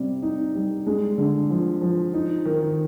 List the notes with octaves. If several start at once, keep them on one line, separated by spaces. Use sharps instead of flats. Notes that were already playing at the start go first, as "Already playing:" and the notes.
Already playing: C3 G3
D#4
G3
G#3
D3
F3
F3
D#4
D#3